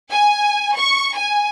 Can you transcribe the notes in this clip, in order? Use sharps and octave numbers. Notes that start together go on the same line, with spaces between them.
G#5
C#6
G#5